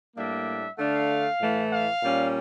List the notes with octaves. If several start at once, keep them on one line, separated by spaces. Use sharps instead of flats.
A2 G3 A#3 D4 E5
D3 A3 D4 F5
A2 E3 A3
F5
A#2 G3 C#4